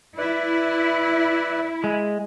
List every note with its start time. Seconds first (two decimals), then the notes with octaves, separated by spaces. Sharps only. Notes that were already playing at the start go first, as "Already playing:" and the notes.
0.18 E4 B4 D5
1.84 G#3